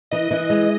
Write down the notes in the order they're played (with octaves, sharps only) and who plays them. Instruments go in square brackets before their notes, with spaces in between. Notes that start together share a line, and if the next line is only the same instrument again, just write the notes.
[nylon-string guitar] E3 [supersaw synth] D#5
[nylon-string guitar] E3
G#3